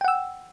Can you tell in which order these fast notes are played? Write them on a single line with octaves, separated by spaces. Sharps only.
G5 F#5 E6